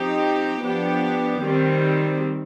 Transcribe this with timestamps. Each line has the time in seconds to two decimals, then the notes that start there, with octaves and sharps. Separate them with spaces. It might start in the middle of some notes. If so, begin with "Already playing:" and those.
Already playing: F3 C4 D#4 G4
0.60 F3 B3 D4 G4
1.42 D#3 G3 C4